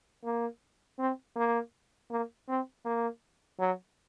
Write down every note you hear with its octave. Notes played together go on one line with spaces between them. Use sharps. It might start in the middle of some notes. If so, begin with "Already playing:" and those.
A#3
C4
A#3
A#3
C4
A#3
F#3